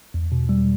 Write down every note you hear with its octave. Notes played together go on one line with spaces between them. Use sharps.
E2
B2
G3